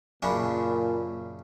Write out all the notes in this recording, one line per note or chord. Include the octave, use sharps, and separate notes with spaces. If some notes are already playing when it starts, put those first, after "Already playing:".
F#2 A#2 C#3 D4 G#5 B5